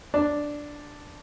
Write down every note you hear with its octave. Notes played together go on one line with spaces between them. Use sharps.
D4